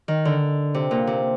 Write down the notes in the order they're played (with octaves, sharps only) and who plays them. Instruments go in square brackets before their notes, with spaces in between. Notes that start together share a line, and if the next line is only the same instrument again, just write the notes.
[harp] D#3
D3
C3
A#2
C3